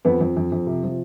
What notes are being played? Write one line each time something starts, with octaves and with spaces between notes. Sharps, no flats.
F2 B3
F2
F2
F2
C3
F3